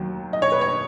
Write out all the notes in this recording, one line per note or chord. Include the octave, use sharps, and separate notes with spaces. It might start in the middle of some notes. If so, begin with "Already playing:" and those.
Already playing: D#2 D#3 F#3
D#5
C#5
B4
C#5